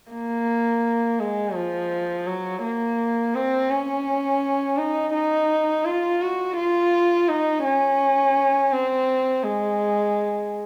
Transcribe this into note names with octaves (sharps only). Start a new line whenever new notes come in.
A#3
G#3
F3
F#3
A#3
C4
C#4
D#4
D#4
F4
F#4
F4
D#4
C#4
C4
G#3